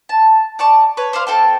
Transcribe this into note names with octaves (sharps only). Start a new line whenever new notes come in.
A5
D5 A5 C#6
B4 C#5
C5 D5 F5 C6
C4 A4 G5 A5